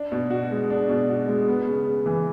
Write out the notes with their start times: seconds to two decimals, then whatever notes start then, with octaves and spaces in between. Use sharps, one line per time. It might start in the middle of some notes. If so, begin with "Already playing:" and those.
Already playing: D4
0.12 B2
0.30 F#4
0.51 G#3
0.70 D4
0.89 B2
1.09 F#4
1.28 G#3
1.48 B3
1.68 C#3
1.87 C#3
2.06 E3